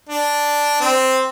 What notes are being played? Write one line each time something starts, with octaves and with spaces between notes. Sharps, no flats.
D4
C4